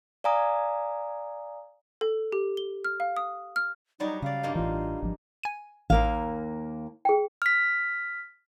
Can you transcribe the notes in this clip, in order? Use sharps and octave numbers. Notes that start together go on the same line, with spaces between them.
D5 F5 G#5 A#5 D#6
A4
G4
G7
F6
F5
D#6
F6
F#3 G3 D#4 C#5
C#3 D5 D#5 F5
G2 A#3 D#4
A1 E3 F4
G#1 F3
G#5 D#7
A1 D#2 A#3 F5
G#4 G5
F6 B6